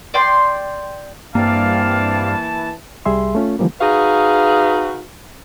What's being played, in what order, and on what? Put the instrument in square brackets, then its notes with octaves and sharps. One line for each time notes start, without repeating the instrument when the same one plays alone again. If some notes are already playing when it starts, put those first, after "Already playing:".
[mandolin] D5 G5 C6
[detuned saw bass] G2 [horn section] E3 A5 [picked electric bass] A#3 [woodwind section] C4 D5 F5
[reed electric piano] C2 G3 G#4 E5 C6
A3 C#4 F4
D3 E3 F3 G3 A#3
[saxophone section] D#4 F#4 G#4 B4 F5